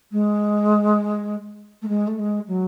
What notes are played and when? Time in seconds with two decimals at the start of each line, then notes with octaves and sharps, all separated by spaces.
0.12 G#3
1.82 A3
1.88 G#3
2.07 A3
2.19 G#3
2.47 F#3